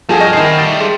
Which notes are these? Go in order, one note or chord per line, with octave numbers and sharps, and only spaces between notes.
G2 F3 G#4 A4 F#5 G#5 A5
D#5 C#6 F6 G6 A#6
D#3 C4 E4 C7
G3 A3 G5 A6
G#4 A4 C6